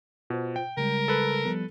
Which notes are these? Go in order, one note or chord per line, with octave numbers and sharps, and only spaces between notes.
B2 F4 C5
G5
C#3 G3 G#3 A#4
A4 B4
F3 G3 B3